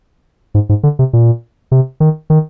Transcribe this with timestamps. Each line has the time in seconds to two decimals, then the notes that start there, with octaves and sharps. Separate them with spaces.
0.54 G#2
0.69 G#2
0.83 D3
0.99 C3
1.13 A#2
1.72 C3
2.00 D#3
2.30 D#3